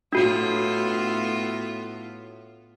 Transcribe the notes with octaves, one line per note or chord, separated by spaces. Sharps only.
A2 B3 D4 F4 F#4